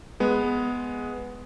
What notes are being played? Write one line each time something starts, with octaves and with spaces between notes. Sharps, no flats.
G#3 B3